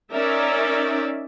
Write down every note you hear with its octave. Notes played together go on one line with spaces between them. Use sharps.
C#4 D#4 A#4 D5 E5